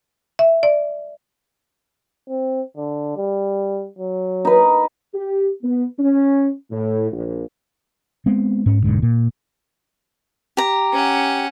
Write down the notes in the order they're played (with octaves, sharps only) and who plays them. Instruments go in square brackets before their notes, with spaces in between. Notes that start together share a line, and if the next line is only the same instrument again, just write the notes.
[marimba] E5
D5
[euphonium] C4
D3
G3
F#3
[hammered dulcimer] D#4 B4
[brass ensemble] G4
B3
C#4
A2
A#1
[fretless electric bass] G#3 B3 C4
G#2 C#4
E1 A#1 G#2 D3
A#2
[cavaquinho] G4 A#5
[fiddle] C#4 F#5